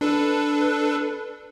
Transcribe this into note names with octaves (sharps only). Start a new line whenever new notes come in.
D4 A4 B4